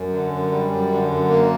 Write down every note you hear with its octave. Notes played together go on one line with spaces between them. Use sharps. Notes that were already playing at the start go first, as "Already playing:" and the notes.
Already playing: F#2
D3
F#2
G3
F#2
D3
F#2
A#3